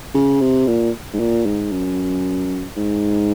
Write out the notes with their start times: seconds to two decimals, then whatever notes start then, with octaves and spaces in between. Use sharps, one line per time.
0.14 C#3
0.41 C3
0.67 A#2
1.13 G#2
1.20 A#2
1.46 G#2
1.72 F#2
2.77 G#2